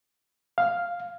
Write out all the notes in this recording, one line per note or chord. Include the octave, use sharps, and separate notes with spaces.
F5